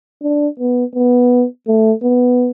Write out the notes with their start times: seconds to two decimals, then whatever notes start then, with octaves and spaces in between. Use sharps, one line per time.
0.23 D4
0.60 B3
0.95 B3
1.67 A3
2.03 B3